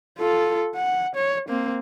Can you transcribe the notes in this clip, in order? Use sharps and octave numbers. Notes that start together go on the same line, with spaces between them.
F4 A4
F#5
C#5
A#3 C4